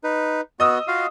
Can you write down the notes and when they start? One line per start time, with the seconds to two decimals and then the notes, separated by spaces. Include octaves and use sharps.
0.04 D#4 B4
0.60 B3 F#4 D#5 D#6 E6
0.88 F4 F#4 F5